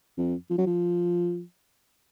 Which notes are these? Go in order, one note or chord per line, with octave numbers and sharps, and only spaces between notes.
F2
F3
F#3
F3